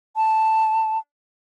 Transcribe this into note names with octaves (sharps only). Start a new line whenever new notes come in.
A5